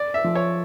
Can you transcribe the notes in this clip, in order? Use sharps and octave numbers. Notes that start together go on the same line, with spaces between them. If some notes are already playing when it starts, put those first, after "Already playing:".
Already playing: D5
E5
F3
C#5